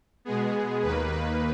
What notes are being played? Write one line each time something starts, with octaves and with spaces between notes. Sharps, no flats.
B2 G#3 B3 G#4
D#2 D#3 A#3 B4
B4